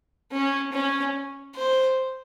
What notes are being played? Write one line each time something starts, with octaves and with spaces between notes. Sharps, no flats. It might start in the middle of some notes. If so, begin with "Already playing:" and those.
C#4
C#4
C5